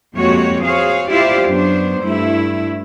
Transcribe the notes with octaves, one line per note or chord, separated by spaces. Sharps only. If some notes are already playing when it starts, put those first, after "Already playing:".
F2 G#3 A#3 F#4 G4 C#5
F#4 G#4 C5 C#5 F5
E4 F4 G4 C5 D5 F5
F#2 B3 D4 C5
G2 A3 E4